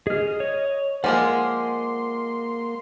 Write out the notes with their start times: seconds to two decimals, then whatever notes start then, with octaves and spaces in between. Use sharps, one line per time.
0.07 G#4 D#5 F6
0.40 C#5
1.04 F3 G#3 A#3 A#4 F#5 G#5 C6 D6